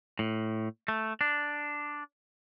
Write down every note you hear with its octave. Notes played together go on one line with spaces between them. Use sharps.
A2
A3
D4